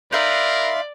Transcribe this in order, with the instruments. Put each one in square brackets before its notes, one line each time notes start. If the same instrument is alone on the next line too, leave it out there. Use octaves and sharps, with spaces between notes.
[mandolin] D#4 B4 E5 [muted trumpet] A#4 [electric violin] D5 [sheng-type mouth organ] F5 C6